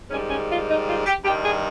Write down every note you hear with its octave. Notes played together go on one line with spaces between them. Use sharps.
G#2 D#3 G3 C#4
C#4
F4
D#4
F4
G4
G2 D#3 G3 G4
G#4